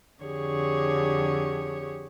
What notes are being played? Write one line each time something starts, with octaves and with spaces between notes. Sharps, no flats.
F2 D3 G4 G#4 C#5 C#6